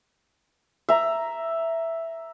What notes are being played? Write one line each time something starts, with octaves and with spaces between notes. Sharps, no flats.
E5 A#5